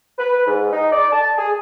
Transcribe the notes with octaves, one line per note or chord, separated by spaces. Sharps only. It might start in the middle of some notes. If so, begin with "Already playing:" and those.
B4
G#2
D#4
D5
A5
G#4